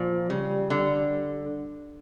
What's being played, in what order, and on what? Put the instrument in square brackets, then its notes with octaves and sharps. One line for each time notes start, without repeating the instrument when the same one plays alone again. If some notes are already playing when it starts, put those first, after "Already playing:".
Already playing: [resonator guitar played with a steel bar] A#2 [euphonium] F3
[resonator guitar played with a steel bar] C#3 [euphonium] G3
[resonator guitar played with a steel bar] D3